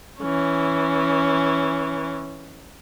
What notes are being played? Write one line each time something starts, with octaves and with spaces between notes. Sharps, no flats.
E3 C#4